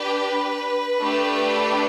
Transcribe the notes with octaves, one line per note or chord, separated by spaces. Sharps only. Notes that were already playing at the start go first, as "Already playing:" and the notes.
Already playing: D4 G4 B4
A3 D4 G4